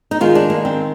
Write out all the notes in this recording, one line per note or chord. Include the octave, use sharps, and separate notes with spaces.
D#4
D#3 G#3 F4
D4
A#3
C4